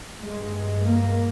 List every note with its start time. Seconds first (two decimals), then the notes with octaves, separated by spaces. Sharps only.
0.23 G2 G#3
0.84 A#3